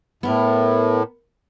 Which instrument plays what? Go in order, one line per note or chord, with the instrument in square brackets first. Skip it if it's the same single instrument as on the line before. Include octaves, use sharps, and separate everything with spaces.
[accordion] A2 [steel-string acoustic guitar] B3 A#4